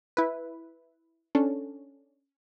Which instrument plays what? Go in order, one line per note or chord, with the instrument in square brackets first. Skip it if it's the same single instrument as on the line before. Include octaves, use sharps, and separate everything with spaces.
[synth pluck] E4 B4
C#4 D4 A4